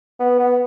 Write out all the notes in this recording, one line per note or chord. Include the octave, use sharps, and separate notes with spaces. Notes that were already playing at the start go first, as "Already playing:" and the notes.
B3
B3